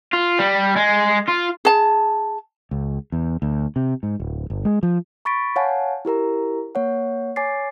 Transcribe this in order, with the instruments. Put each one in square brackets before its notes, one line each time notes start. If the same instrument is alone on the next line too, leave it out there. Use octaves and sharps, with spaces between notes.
[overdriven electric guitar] F4
G3
G#3
F4
[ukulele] G#4 A5
[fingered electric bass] C#2
E2
D2
C3
G#2
D1
G1
G#3
F3
[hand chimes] B5 C#6 A6 B6 D7
C#5 F5 F#5 G#5 A5
E4 G4 A#4 A#5
A#3 C#5 F#5
C#5 G#5 D6 A6 C7